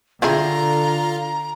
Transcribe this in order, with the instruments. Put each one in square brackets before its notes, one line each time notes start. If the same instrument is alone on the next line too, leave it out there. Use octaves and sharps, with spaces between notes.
[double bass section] D3 [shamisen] C4 E4 G#4 [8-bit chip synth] F4 [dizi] A#5